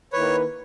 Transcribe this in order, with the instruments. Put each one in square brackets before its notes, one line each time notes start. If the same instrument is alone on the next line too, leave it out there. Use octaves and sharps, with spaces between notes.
[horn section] D#3 A#3 E4 B4 [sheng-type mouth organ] C#5